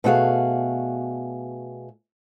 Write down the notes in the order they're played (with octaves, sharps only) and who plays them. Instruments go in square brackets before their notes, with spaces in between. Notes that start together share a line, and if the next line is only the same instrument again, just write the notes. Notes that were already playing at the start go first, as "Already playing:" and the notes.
[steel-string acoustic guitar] B2 A3 E4 F#4 G#4 F5